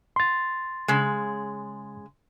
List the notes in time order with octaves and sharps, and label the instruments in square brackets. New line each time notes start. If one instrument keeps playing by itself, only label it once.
[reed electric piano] C6 A6
[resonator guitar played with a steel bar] C#3 G#3